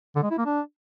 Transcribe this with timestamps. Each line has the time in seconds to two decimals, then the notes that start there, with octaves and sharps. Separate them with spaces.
0.16 D3
0.23 G#3
0.31 E4
0.38 A#3
0.46 D4